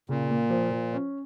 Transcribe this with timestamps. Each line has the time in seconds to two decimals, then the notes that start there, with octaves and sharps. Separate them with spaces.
0.09 A#2 C#3
0.30 A#3
0.50 F3
0.71 F3
0.93 C#4